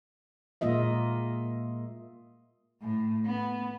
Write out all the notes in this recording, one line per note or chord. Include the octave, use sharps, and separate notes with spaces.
A#2 G#3 A#3 F4 D#5 E5
A2
B3